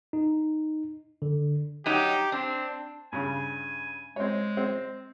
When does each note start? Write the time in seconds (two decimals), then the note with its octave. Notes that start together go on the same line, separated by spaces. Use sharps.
0.13 D#4
1.22 D3
1.86 F#3 D#4 G4
2.32 C4 D4
3.13 G2 C#3 G#5
4.16 G#3 C4 C#5
4.57 C4